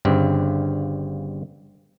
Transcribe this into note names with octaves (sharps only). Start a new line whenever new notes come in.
G1 G2 C#3 C4